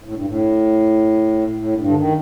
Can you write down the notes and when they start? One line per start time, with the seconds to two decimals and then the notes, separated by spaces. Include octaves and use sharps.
0.04 A2
0.15 G2
0.25 A2
1.57 A2
1.77 G2
1.87 D3
1.96 D#3